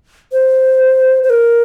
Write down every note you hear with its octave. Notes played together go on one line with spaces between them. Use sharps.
C5
C5
A#4